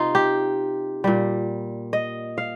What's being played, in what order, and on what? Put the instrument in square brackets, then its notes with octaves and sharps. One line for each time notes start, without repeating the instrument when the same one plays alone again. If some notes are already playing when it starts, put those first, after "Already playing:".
Already playing: [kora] C3 D#4 F4
G4
A#2 G3
D#5
F5